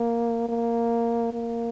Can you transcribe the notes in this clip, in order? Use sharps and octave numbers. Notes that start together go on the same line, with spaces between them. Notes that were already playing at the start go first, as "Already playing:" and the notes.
Already playing: A#3
A#3
A#3